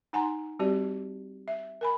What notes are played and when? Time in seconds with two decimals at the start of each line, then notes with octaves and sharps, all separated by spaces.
0.13 D#4 F#5 G#5 A#5 C6
0.59 G3 C4 F#4 G4 D5
1.48 E5
1.81 A#4 G#5 B5